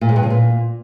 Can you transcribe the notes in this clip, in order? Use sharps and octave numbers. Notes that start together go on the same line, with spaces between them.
A#2
G#2
G2
C#3
A#2